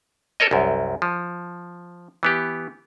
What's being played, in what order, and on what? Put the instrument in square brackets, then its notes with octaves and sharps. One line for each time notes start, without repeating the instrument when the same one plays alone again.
[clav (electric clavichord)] A4 A#4 C#5 D#5
C2 F#2
F3
E3 B3 G4